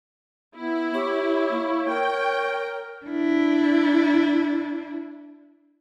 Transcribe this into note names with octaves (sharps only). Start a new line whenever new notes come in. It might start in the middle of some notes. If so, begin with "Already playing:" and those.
B3 E4
G4 C#5
A#3
A#4 G5
D4 E4